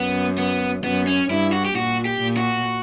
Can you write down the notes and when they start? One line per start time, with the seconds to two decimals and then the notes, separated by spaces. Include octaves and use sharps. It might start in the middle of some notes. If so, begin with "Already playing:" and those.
Already playing: F#2 B3
0.38 B3
0.84 F#2 B3
1.07 C#4
1.29 G2 E4
1.52 F#4
1.65 G4
1.75 A#2 F#4
2.05 G4
2.21 A#2
2.37 F#4